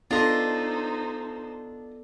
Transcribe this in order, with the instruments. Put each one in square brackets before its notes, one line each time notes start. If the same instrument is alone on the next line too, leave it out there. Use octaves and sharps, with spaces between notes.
[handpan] B3 A4 [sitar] D4 [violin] D#4 C5 [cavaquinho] F4 D#5 C6